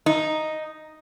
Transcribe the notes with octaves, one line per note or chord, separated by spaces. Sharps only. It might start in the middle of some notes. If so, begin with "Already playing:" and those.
D#4